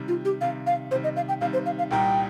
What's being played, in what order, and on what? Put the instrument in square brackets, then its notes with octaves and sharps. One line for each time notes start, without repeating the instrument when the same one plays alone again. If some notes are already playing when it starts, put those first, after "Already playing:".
Already playing: [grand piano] C3 D#3 G3
[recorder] F4
G4
[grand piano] C3 D#3 G3 [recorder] F5
[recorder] F5
[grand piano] C3 D#3 G3 [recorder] C5
[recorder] D#5
F5
G5
[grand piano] C3 D#3 G3 [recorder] F5
[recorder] C5
F5
F5
[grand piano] C2 A#2 G3 D#4 A#4 [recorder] G5